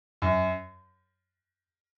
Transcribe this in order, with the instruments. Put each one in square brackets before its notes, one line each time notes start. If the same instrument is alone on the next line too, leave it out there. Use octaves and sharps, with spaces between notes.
[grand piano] F#2